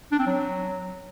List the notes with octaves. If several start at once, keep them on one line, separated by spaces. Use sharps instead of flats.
D4
C4
F#3